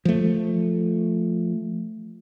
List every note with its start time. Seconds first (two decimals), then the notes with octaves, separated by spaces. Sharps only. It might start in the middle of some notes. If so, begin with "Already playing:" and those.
0.05 F3 A3